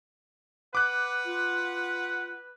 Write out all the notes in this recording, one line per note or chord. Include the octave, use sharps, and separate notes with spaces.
B4 F#5 D6 F#6
F4